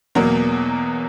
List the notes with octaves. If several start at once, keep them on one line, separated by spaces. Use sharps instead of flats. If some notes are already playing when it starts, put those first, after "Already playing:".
E2 B2 F#3 A#3